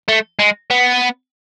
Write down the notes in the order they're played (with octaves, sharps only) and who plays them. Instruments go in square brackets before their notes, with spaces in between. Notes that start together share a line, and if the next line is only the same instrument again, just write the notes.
[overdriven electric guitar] A3
G#3
B3